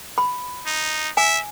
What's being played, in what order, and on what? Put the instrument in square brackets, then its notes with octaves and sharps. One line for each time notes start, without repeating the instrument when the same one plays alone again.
[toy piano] B5
[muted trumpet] D#4
[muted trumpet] E5 [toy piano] G#5